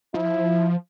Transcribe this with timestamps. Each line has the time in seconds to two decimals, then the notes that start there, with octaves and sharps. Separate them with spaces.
0.14 F3 E4